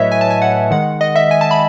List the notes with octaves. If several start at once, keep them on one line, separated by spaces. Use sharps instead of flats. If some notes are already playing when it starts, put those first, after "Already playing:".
Already playing: A2 F#3 A3 B4 C#5 D#5 E5
G#5
A5
G#5
F#5
D#3 G#3 F#5
D#5
E5
G#5
A5
B5